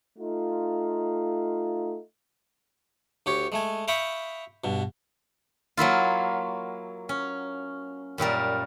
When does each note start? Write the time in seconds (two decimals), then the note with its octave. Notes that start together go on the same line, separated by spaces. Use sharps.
0.19 A3 D#4 F4
3.26 D2 G4 C#5
3.52 G#3 A3 G#5
3.88 E5 F5 G5 B5 C#6 D#6
4.64 G2 B2
5.77 F#3 A#3 E4 F4
7.09 C#4
8.18 F#2 A#2 G3 A#4